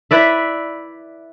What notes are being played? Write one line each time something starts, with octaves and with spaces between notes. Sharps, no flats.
E4 B4 D5 E5